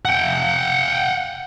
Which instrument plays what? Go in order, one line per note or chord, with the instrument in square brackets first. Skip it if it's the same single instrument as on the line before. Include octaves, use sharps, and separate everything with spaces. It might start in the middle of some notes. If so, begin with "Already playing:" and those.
[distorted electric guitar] F#5 G5